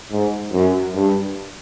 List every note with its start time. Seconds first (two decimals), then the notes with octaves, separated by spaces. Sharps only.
0.12 G#2
0.53 F#2
0.95 G2